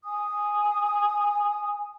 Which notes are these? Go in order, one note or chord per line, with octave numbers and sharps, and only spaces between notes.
G#5 D#6